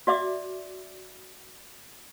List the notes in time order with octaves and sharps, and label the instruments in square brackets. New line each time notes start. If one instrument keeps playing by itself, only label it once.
[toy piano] F#4 D5 E5 D6